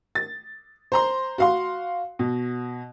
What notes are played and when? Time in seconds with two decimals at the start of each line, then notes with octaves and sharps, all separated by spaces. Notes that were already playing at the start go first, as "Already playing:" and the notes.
0.15 A6
0.92 C5 A#5 C6
1.38 F#4 F5 C6
2.19 B2